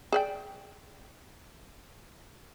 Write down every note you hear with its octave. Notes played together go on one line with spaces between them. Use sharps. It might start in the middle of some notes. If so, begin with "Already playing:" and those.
G#4 D5 G5